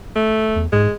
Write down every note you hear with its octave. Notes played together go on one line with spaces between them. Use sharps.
A3
E2
G#2 G#3